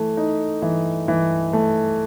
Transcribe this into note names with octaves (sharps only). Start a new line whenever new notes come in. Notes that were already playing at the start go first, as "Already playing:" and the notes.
Already playing: E3 A3
D#4
E3
E3
A3